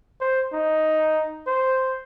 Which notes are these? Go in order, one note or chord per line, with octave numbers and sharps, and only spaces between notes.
C5
D#4
C5